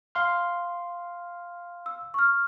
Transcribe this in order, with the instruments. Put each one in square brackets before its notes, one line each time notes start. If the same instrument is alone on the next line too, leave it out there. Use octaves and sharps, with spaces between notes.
[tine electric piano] F5 C6 F6
[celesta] E6
C#6 F6